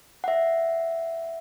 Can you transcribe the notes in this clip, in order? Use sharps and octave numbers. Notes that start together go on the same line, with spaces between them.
E5 F#5